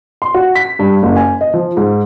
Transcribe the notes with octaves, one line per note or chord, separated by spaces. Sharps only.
C6
F#4
B6
G2
F#1
G#5
D#5
F3
G#2